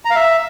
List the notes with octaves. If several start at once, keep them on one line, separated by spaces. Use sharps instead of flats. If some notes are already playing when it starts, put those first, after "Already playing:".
A#5
F5
E5